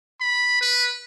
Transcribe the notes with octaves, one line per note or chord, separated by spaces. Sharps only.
B5
B4